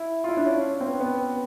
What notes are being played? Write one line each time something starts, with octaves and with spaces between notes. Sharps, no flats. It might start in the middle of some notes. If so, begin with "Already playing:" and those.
Already playing: E4
F4
E4
D4
C#4
C4
B3
B3